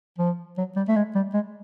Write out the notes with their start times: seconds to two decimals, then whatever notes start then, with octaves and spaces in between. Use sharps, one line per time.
0.18 F3
0.57 F#3
0.76 G3
0.88 A3
0.96 G#3
1.15 G3
1.34 G#3